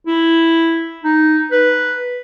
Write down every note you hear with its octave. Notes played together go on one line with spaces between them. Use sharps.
E4
D#4
B4